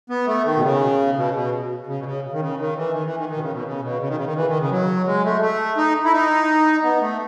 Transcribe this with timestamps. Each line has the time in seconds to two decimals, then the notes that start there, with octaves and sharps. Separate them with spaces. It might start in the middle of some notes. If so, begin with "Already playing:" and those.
0.10 B3
0.26 A3
0.45 D#3
0.57 B2
0.63 C#3
1.16 B2
1.34 B2
1.87 C#3
1.97 B2
2.04 C#3
2.33 D#3
2.40 C#3
2.58 D#3
2.76 E3
2.93 D#3
3.05 E3
3.17 D#3
3.29 D#3
3.36 B2
3.41 C#3
3.53 B2
3.65 C#3
3.82 B2
4.00 C#3
4.08 D#3
4.17 C#3
4.26 D#3
4.35 E3
4.48 D#3
4.60 C#3
4.70 F#3
5.06 G#3
5.24 A3
5.41 A3
5.77 D#4
6.04 E4
6.13 D#4
6.83 B3
7.01 A3